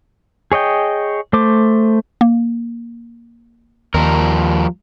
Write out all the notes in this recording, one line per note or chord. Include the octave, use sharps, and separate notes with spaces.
G#4 C#5 D#5 G5
A3 C5 D6
A#3
D#2 F3 G3 A#4